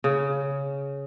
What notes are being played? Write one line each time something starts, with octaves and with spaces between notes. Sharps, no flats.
C#3